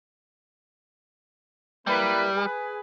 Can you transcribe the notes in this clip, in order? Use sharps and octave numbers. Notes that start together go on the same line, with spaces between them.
G3 A#3 E4 B4
G#4 B4